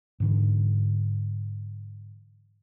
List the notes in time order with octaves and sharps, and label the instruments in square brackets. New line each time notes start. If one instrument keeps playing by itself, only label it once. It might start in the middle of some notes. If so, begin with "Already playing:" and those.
[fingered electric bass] G#2 D3 E3